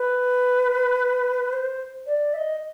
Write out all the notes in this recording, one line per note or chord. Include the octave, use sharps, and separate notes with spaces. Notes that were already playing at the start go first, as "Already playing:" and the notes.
Already playing: B4
C5
D5
E5
D#5